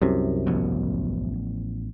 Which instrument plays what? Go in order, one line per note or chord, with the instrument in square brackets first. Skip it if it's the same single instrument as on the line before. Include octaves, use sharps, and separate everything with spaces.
[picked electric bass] C2 F#2 C3
[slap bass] A1 F3 B3